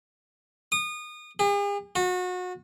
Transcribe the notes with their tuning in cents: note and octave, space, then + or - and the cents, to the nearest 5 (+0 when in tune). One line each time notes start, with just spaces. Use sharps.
D#6 -30
G#4 -45
F#4 -30